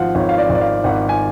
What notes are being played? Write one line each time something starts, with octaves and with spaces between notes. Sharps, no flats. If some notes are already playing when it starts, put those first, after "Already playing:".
Already playing: G#1 F3 F5 F#5
G#1 C#5
F5
D5
G#1
D5
F5
G#1 F#5
G#5